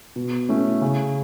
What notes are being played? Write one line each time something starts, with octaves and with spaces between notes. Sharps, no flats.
B2
A3 C#4 E4
C#3